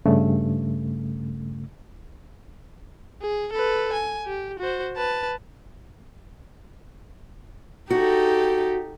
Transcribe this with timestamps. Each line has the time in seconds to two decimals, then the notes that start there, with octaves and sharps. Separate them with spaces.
0.06 G2 C#3 A3
3.22 G#4
3.53 A4 B4
3.93 G#5
4.26 G4
4.59 F#4 C5
4.96 B4 A5
7.90 D#4 F#4 G4 A4